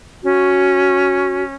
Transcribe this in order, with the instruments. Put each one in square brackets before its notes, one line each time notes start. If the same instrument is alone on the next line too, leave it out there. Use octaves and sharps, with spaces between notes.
[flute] C#4 [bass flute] F#4